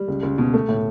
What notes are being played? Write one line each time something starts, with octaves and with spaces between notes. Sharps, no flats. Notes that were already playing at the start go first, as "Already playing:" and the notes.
Already playing: G3
C#2
C#2
B2
A3
A2